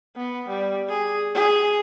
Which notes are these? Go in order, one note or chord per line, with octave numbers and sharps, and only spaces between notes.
B3
G3
G#4
G#4